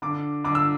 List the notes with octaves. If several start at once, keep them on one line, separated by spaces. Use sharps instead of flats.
D3 D6
D3 D6
E6